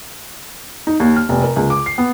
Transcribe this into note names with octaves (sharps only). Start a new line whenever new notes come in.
D#4
D#2
F6
F1
A#4
C#2
D6
C7
B3